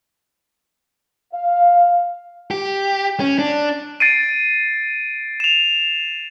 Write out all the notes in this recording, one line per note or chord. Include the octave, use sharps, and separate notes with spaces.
F5
G4
C#4
D4
A6 C7 D7 D#7
E7 F7